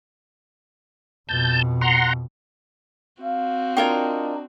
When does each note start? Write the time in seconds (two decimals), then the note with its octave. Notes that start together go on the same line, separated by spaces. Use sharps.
1.29 F2 B2 A5 G6
1.81 F#5 A#5 C6
3.23 C4 F#4 F5
3.77 D4 F4 A#4 D5 D#5 G5